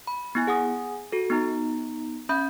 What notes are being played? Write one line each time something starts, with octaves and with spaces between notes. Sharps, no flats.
B5
B3 E4 G#5
G#4 F#5 G#5 D#6
F#4 A4
B3 D#4 A#5
C#4 E5 B5 G6